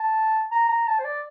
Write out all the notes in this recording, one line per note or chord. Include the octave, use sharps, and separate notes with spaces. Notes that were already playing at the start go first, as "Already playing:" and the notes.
Already playing: A5
A#5
A#5
A5
C5
D5